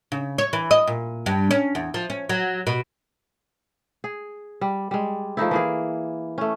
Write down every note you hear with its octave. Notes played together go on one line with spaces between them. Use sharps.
C#3
C#5
E3
D#5
A#2
G2
C#4
E2
F3
C#4
F#3
B2
G#4
G3
G3 G#3
F3 A3 D#4 E4
E3 A#3 G#4
A3 C#4